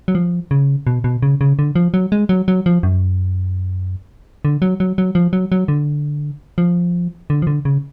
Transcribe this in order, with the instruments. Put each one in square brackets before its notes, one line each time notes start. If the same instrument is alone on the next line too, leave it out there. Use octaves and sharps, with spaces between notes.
[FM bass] F#3
F3
C#3
B2
B2
C#3
C#3
D3
F3
F#3
G#3
F#3
F#3
F3
F#2
D3
F#3
F#3
F#3
F3
F#3
F#3
D3
F3
D3
F3
D3
C#3